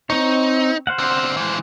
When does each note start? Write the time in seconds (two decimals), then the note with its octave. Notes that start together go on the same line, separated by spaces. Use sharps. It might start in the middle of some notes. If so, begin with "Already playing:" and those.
0.10 C4 D#4 C#5
0.87 C5 F5 F#5
0.99 D3 C4
1.37 E3 G#3